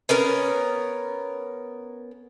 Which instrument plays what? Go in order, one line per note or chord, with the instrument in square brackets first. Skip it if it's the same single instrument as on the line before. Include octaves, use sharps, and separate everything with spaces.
[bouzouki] B3 C#4 A#4